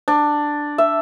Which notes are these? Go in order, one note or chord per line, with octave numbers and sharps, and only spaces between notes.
D4
E5